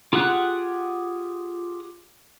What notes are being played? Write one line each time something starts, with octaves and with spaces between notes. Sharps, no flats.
F4 G4 G#4 F#5 F#6